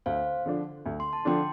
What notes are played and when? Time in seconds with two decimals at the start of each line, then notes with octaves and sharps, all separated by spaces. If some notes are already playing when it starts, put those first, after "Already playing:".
0.06 D2 C5 F5
0.46 D3 F3 D4
0.86 D2
1.00 C6
1.13 A5
1.25 D3 F3 D4 G5 C6